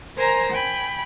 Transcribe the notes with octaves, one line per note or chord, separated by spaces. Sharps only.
A#4 C5 G#5 A#5 A#6
G5 G#5 B5